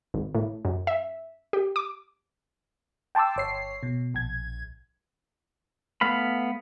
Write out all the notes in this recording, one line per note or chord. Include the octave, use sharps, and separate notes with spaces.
G#1
A2
F#2
E5
G4
D6
G5 A5 C6 D6 E6
G1 C#5 C7
B2
A#1 G#6
A3 B3 F5 B5